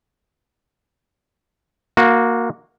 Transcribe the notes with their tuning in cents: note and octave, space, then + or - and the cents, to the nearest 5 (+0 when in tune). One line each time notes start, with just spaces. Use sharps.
A#3 +0 F#4 -15